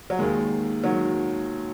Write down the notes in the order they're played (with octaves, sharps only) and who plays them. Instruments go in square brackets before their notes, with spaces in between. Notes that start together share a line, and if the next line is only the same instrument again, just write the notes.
[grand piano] F#3
D#2 D#3 G#3
D#3 F#3